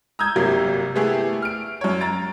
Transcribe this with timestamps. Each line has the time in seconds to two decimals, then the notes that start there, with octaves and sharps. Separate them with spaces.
0.19 A#5 D#6 E6 G6 G#6
0.36 G1 C3 F#3 A#3
0.95 A3 B3 E4 G4 G#4
1.42 F6 D7
1.81 F#2 C#5
2.01 A#5 A6 D7